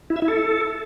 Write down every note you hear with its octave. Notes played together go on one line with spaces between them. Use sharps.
E4
E5
E4
A4